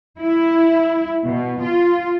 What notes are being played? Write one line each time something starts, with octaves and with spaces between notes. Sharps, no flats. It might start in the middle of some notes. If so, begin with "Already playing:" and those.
E4
B2
F4